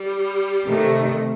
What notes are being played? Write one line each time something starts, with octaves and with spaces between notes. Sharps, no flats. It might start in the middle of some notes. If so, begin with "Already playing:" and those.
Already playing: G3
C3 D#3 A3